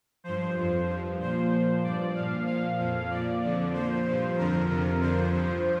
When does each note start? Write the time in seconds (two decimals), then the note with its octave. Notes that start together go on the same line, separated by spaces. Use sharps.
0.24 G2 F3 C5
0.56 F2 F3
0.87 G2 F3
1.19 A#2 F3 C5
1.51 A#2 F3
1.83 G2 F3 D5
2.14 A#2 F3 F5
2.46 A#2 F3 F5
2.78 F2 F3
3.10 A#2 F3 D5
3.41 F2 D3 F3
3.73 A#2 F3 C5
4.05 G2 F3
4.37 F2 D3 F3 A#4
4.69 F2 C3 F3
5.00 F2 D3 F3 C5
5.33 G2 F3